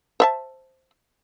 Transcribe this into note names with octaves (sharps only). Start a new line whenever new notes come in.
C5 E5 A5